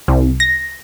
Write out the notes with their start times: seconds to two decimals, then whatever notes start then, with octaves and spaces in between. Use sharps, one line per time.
0.08 C2
0.40 A#6